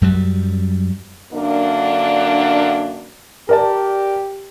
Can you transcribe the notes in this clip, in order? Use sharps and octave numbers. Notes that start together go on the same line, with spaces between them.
F#2 F#3 G3
F#2 D3 A#3 D4
G4 A#4 D5 A5